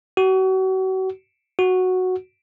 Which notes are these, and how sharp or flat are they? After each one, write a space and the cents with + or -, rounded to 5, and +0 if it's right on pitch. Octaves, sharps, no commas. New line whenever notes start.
F#4 +35
F#4 -5